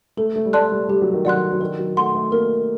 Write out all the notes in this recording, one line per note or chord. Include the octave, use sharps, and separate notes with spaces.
A3 A4
A3
G3
A3 D5 A5 C6 F#6
G3
G3 G4
F#3
D#3
F#3 D5 F#5 C6 F#6
F#3
D#3 A#4
F#3
A3 F#5 C6
A3
A#3 A#4